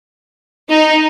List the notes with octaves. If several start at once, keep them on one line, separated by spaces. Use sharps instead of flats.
D#4